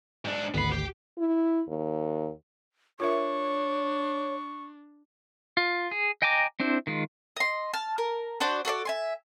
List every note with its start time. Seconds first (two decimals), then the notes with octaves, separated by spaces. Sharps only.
0.25 G#2 D4
0.54 G#1 D2 B3 B5 C7
0.72 G4
1.18 E4
1.68 D#2
3.00 D4 F4 A#4 C#5 E5 C#6
5.57 F4
5.91 G#4
6.22 D#5 G5 G#5 A#5 D6
6.60 C4 D4 E4 C5
6.87 D#3 G#3 F4
7.37 D#5 C6
7.73 A5 F6
7.98 A#4
8.40 D4 F#4 C5 D5
8.65 F#4 A4 C5 D5
8.85 E5 G#5 C6